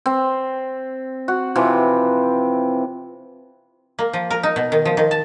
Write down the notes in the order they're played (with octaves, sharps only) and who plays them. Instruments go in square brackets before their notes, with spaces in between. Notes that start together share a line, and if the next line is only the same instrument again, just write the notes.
[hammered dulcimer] C4
F#4
C3 E3 F3 C4
[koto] A#3
F3
A#4
D#4
B2
D#3
F3
D#3
A5